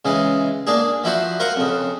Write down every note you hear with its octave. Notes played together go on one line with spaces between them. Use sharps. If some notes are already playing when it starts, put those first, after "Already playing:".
C#3 E3 G#3
A#3 D4 G#4
F3 E4 F#4 C5
F4 A#4 C5 F#5
F2 C#3